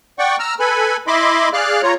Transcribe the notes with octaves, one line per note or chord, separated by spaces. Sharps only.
D5 F#5 G5 C#6
A#5 E6 F6
A4 B4 G#5 B5
E4 D#5 E5 B5 C6 D6
G#4 D5 F5 F6 F#6
F4 C#5 A#5